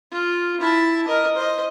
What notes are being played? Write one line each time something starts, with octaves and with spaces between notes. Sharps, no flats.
F4
E4 A5
A#4 D#5
C5 D#5